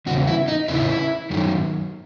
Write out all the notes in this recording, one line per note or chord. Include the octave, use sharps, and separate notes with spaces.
E2 C#3 F#4
E4
D#4
E2 C#3 E3 E4
F#2 D#3 F#3